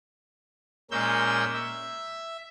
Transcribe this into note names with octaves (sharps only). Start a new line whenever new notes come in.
A#2 G#3 A#3 C#4 E6 G6
E5